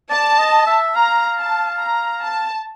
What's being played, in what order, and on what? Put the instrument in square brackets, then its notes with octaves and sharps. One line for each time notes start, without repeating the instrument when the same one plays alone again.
[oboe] D5 [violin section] A5
[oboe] D#5
E5
[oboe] F5 [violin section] A#5
[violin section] A5
A#5
A5